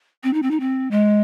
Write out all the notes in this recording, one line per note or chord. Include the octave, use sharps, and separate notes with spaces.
C4
D#4
C4
D#4
C4
G#3